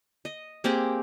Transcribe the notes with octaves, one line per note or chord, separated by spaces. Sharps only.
D#5
A#3 C4 G4 G#4